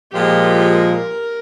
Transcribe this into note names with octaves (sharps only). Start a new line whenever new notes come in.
A#2 F3 G#3 G4
A#4